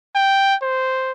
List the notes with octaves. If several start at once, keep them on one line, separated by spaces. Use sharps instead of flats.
G5
C5